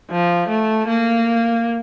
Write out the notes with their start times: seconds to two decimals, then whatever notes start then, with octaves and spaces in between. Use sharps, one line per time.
0.11 F3
0.49 A3
0.88 A#3